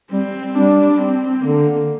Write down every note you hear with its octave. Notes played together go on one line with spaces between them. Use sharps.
G3 C4
G3 D4
C4
D3 A#3